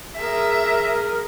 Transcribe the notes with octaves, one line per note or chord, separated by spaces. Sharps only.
G#4 A#4 E5